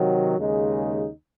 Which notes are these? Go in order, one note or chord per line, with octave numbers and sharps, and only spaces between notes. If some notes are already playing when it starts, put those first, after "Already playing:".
Already playing: C3 D#3 F#3
D#2 C#3 G#3 D#4